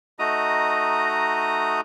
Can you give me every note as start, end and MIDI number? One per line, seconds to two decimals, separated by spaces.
0.19 1.81 57
0.19 1.81 63
0.19 1.81 66
0.19 1.81 75
0.19 1.81 82
0.19 1.81 87